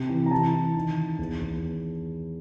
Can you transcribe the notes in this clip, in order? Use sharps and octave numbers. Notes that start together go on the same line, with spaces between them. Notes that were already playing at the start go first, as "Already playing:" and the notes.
Already playing: C3
E3
A#5
E3 A5
E3
D#3
D#3
E2
E2